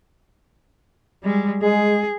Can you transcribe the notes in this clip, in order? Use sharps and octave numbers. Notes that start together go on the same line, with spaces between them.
G3 G#3
G#3 G#4